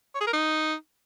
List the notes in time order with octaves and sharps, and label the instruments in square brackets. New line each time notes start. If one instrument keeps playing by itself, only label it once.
[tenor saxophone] C#5
G#4
A#4
D#4